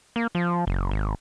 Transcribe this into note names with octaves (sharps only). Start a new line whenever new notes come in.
A#3
F3
F#1
G#1